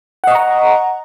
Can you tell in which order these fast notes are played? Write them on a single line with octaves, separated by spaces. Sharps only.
F#5 D#5 C#6 A#5